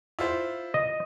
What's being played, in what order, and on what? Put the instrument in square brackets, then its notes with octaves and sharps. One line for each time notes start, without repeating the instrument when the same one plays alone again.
[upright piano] E4 F4 C5
[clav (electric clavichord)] D#5